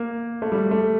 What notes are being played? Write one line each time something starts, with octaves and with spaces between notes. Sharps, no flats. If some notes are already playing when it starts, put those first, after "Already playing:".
Already playing: A#3
A3
G3
A3